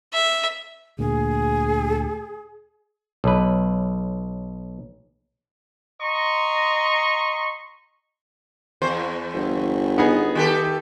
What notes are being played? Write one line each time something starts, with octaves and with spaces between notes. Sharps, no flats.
E5
D2 A#2 A#3 G#4
B1 B4
D#5 A#5 C6 C#6
E2 C5
G1
B3 D#4 G#4
D#3 G4 A4